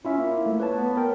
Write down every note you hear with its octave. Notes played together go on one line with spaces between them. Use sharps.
C#4 E4 F4 E5
A#3
A3
B4 C#5 A5
B3
A#4 G5